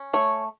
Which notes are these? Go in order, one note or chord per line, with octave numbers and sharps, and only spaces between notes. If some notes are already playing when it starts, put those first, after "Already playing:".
Already playing: C#4
A3 C#5